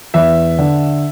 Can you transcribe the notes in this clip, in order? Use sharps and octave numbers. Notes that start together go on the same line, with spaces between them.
E2 E5
D3